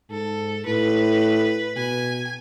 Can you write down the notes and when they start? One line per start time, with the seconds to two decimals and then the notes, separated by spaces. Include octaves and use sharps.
0.10 G#2 A4
0.66 A2 B4
1.77 B2 G#5